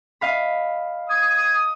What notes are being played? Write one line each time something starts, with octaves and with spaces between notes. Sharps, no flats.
D#5 F5 B5
D#6 G#6